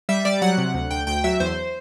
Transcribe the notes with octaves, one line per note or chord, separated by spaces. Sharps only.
G3 E5
G3 D5
F#3 F#5
C3
D2
D2 G5
D2 G5
F#3 E5
E2 C5